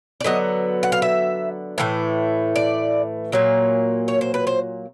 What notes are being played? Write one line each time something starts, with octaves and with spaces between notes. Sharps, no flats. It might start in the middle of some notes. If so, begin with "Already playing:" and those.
D5
D3 F#3 B3 D#5
F#5
F5
E5
A2 E3 A3
D5
A#2 F#3 A#3
C#5
C5
B4
C5